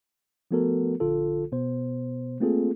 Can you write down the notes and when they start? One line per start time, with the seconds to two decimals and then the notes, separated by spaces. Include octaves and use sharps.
0.51 F3 A3 B3 F#4 A4 A#4
1.00 A#1 D3 F4 A4
1.52 B2 B3 C5
2.40 A3 A#3 C4 F4 G#4 A4